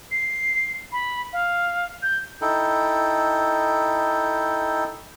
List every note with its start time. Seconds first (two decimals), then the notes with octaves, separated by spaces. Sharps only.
0.11 C7
0.92 B5
1.33 F5
2.03 G6
2.41 D#4 E4 A4 G5